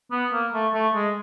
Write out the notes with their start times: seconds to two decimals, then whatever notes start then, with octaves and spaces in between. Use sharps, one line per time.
0.11 B3
0.33 A#3
0.53 A3
0.74 A3
0.95 G#3